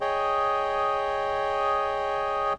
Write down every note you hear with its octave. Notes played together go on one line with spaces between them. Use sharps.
G#4 C#5 D#5 G5